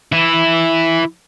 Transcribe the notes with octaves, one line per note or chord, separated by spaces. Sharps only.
E3 E4